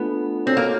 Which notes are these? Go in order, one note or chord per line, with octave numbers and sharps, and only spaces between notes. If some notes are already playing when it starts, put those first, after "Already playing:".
Already playing: A3 B3 D4 F4 A4
C4 D#4 F#4 A4 C#5
A#3